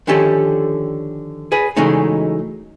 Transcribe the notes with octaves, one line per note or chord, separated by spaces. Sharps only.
D3 D#3 F3 C#4 G4 A4
G#4 B4
C#3 E3 F#3 G#3 A3 D#4